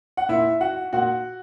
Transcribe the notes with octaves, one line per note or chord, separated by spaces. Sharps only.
F#5
A#2 E4 E5
F#4 F#5
A#2 F#4 F#5